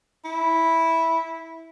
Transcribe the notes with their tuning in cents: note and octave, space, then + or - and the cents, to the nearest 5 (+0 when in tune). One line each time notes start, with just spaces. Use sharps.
E4 -10